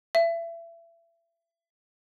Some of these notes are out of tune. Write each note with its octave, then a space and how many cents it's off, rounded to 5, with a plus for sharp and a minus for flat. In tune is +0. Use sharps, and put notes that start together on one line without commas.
E5 +30